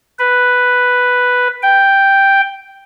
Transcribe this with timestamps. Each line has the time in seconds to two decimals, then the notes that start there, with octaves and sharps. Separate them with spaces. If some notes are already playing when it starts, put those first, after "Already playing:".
0.19 B4
1.62 G5